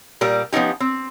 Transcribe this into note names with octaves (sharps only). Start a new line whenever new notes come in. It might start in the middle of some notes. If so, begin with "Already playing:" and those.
A#2 G3 A#4
F3 B3 C#4 D#4 G4
C4